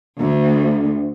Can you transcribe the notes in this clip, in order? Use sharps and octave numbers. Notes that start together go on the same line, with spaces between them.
D2